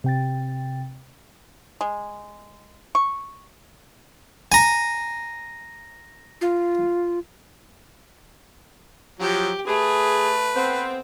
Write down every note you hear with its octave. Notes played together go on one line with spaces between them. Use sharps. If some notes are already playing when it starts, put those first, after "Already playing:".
C3 G5 A6
G#3
C#6
G#5 A#5
F4
F3 F#3 G4
A3 G#4 B4
B3 C4